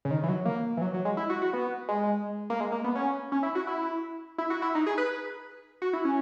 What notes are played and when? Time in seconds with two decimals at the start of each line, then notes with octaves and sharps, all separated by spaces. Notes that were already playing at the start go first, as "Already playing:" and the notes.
0.05 C#3
0.11 D#3
0.23 E3
0.28 F#3
0.45 A#3
0.77 E3
0.81 F#3
0.94 F#3
1.05 G#3
1.17 E4
1.30 F#4
1.42 F#4
1.53 B3
1.88 G#3
2.50 A#3
2.60 G#3
2.72 A#3
2.84 B3
2.95 C#4
3.32 C#4
3.43 E4
3.55 F#4
3.67 E4
4.38 E4
4.50 F#4
4.62 E4
4.75 D#4
4.86 G#4
4.98 B4
5.82 F#4
5.93 E4
6.05 C#4